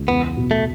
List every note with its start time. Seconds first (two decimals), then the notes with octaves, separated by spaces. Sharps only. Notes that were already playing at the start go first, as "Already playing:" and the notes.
Already playing: C#2
0.08 E2 B3
0.37 B2
0.51 A3